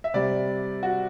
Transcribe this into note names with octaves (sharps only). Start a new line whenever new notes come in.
E5
C3 G3 D5
F#4